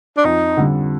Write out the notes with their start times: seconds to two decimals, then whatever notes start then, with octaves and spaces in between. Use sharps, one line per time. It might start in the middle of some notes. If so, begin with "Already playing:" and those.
0.17 D4
0.24 F2 D#4
0.57 D3 G3